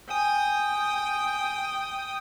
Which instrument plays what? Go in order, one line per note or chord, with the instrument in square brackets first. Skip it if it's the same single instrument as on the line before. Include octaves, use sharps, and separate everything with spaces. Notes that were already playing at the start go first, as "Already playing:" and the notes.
[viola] G5 [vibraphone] G#5 [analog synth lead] D#6